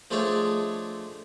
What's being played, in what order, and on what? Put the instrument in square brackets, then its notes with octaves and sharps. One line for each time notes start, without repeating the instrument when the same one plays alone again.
[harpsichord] F3 G#3 A3 D4 G#4 C#5